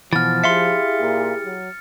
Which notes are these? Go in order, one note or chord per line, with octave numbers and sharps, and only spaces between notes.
B2 E3 F3 F6 A6
E4 G4 G#4 E5 F5 C6 C#7
A#2
F#3